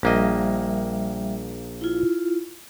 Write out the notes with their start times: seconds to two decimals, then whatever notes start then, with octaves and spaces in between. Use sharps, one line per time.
0.03 A#1 G3 A#3 D#5 E5
1.81 E4 F4